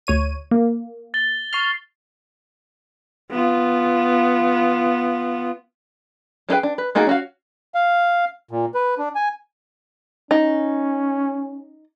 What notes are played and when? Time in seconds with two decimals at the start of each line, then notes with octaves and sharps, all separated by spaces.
0.07 D2 C#5 D#7
0.51 A#3
1.14 A6 G7
1.53 C#6 F6 C7 G7
3.31 B3 F4
6.49 G3 D4 G#4 B4 G5
6.63 D4
6.78 B4
6.95 A3 A#3 D#4 F#4 G#4
7.07 C#4 F#4 F5
7.74 F5
8.51 A#2
8.74 B4
8.98 D4
9.15 G#5
10.31 C#4 D#4